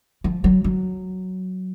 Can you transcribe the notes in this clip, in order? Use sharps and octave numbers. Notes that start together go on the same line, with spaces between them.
F3
F#3
F#3